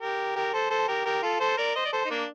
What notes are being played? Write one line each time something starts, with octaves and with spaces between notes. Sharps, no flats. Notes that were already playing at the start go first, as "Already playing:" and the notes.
G4 A#4
G4 A#4
A4 C5
A4 C5
G4 A#4
G4 A#4
F4 A4
A4 C5
A#4 D5
C5 D#5
D5
A4 C5
D#4
A#3 D4